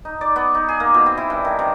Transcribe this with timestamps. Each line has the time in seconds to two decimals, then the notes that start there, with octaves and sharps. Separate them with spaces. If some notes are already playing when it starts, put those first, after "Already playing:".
0.05 D#4
0.21 D5
0.36 B3
0.55 D#4
0.69 G#4
0.80 A#3
0.94 B2
1.06 C4
1.17 E4
1.30 G2
1.45 D#3
1.59 C3